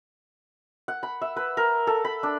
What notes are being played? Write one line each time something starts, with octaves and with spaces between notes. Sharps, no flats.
F#5
B5
E5
B4
A#4
A4
B5
D4